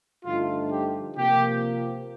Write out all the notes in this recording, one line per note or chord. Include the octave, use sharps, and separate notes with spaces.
G2 D3 F3 A3 D#4 F4
G4
C3 F3 A#3 G4